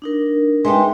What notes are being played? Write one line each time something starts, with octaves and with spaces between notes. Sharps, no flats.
D4 D#4 A#4
G#3 D#4 G4 B4 E5 C6